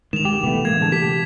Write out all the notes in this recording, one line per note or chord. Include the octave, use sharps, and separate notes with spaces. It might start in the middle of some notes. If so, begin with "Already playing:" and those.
D#3 G#3 E7 F7
G4
C3 E3 A3 B3
A2 G#3 A#3 G#6
D3 A5
G4 B6